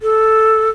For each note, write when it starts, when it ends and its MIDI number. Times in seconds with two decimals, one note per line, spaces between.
0.02 0.69 69